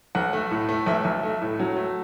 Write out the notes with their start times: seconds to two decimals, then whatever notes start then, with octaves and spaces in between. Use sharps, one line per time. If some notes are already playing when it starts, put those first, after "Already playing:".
0.15 B1 F#5
0.33 A3
0.51 A2
0.69 A3
0.86 B1 E5
1.05 B1
1.23 A3
1.41 A2
1.59 F#3
1.77 A3